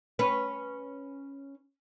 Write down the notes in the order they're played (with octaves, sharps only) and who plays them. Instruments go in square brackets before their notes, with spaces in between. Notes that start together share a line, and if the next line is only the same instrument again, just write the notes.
[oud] C#4 B4